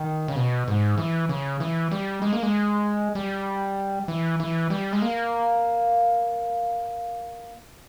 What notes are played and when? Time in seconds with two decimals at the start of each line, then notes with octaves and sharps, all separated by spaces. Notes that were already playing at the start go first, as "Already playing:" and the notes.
Already playing: D#3
0.28 C#3
0.36 B2
0.68 G#2
0.98 E3
1.29 C#3
1.60 E3
1.91 G3
2.22 G#3
2.33 A#3
2.43 G#3
3.15 G3
4.08 E3
4.40 E3
4.70 G3
4.93 G#3
5.02 A#3